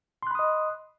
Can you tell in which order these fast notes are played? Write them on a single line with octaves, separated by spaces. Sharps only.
C6 F#6 B5 D#6 D#5